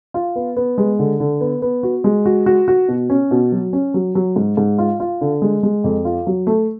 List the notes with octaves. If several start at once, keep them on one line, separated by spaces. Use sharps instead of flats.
F4
B3
B3
G#3
D3
D3
B3
B3
F#4
G#3
F#4
F#4
F#4
B2
C#4
B2
F#3
C#4
F#3
F#3
G#2
G#2
F4
F4
D3
G#3
G#3
F2
F4
F#3
A3